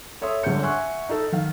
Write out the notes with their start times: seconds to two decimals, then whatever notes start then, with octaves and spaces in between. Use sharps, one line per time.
0.22 A4 C#5 E5 C6 D#6
0.43 G1 D3 G#3 C#5 G6 C#7
0.63 E5 F#5 G#5 C6 C#6 F#6
1.09 D#4 A4
1.32 D#3 F5